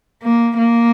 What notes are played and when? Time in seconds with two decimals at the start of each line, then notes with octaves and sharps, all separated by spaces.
0.23 A#3
0.58 A#3